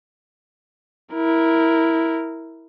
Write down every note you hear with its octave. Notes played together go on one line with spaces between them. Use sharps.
E4 A#4